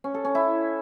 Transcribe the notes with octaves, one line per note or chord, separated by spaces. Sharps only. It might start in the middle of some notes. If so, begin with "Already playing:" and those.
C#4
A4
C#4
E4